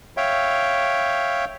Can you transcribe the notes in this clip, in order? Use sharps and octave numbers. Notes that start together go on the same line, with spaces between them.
C#5 E5 F5 G5